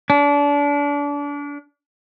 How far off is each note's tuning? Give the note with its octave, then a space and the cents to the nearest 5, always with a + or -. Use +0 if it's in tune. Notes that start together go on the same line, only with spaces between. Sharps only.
D4 -30